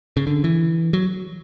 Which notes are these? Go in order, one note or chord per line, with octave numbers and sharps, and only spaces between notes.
C#3
D3
E3
F#3